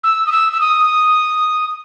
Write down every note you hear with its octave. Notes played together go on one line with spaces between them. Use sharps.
E6
D#6
E6
E6
D#6